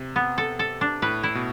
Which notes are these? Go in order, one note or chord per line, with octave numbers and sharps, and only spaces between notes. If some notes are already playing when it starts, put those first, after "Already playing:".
Already playing: C3
B3
A4
A4
D4
A2 B4
E4
B2